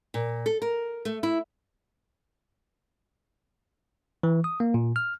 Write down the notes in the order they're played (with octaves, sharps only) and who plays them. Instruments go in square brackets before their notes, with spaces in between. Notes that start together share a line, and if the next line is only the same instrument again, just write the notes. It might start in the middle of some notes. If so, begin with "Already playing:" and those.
[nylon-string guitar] A#2
A4
A#4
A3
E4
[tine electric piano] E3
D#6
A#3
A#2
F6